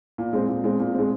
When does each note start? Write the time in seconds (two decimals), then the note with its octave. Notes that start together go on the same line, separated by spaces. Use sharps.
0.18 A#2
0.33 G#3 C4
0.48 A#2
0.64 G#3 C4
0.79 A#2
0.94 G#3 C4